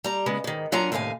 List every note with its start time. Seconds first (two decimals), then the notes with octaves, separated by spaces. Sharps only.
0.04 G3 A#5
0.26 C#3 G#3 B3
0.44 G#2 D#3
0.72 F#3 D4 F4 F#5 G#5 A#5
0.92 D#2 A2 C3 F5 G#5